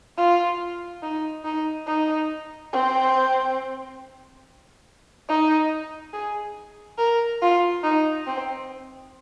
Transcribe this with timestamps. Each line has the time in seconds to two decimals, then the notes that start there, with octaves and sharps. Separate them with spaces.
0.18 F4
1.02 D#4
1.45 D#4
1.87 D#4
2.73 C4
5.28 D#4
6.13 G#4
6.98 A#4
7.42 F4
7.83 D#4
8.27 C4